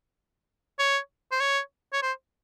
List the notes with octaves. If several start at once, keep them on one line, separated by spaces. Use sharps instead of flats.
C#5
C5
C#5
C#5
C5